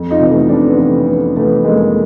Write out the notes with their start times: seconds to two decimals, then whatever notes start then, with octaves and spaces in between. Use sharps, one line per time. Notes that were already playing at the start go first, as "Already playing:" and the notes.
Already playing: F2
0.11 D#4 F4
0.20 C3 E3
0.30 A3 B3
0.49 F2 C4 D4
0.68 B3 C#4
0.78 C3 E3
1.07 F2 B3 C#4
1.36 C3 E3 A3 B3
1.65 F2 G#3 A#3